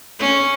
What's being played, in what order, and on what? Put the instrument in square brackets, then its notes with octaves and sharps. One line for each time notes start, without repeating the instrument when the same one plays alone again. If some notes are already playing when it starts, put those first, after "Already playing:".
[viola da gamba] C#4